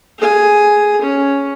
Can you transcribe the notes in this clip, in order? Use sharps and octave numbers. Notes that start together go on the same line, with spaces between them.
G#4 G#5
C#4